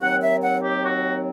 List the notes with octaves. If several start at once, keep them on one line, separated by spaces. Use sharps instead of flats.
D#2 D#3 F#3 C4 F#5
E5
F#5
G4
F#4